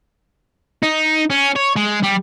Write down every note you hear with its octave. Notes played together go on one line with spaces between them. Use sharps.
D#4
C#4
C#5
G#3
G3